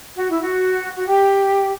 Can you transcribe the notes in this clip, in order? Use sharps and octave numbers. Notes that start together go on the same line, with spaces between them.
F#4
E4
F#4
F#4
G4